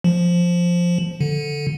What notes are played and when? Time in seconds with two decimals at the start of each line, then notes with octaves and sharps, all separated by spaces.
0.04 F3
1.21 D3